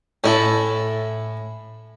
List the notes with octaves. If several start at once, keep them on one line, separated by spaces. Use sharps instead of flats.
A2 C#4 E4 A4